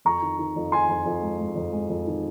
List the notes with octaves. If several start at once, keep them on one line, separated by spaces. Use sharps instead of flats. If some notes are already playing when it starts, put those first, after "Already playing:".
F2 A#5 C#6
D#3
D#3
F2
D#3 G#5 C6
F2
F2
G#3
G#3
F2
G#3
F2
D#3